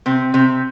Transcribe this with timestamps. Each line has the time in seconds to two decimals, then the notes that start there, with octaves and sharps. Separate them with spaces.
0.06 C3 C4
0.34 C3 C4